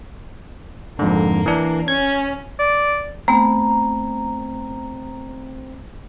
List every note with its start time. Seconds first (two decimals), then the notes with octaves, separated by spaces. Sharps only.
0.99 F2 G#2 D3 A#3
1.46 E3 D4
1.88 C#4 G#6
2.59 D5
3.28 A3 B3 C4 A#5